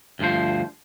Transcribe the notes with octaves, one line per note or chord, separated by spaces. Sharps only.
D2 G2 C3 F3 C5